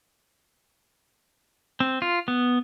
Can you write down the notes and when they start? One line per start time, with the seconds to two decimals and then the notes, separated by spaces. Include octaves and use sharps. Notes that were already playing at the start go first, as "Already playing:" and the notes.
1.80 C4
2.02 F4
2.28 B3